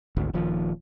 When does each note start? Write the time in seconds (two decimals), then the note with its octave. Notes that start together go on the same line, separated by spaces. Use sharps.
0.17 G#1 D2
0.34 D#1 D#2 F3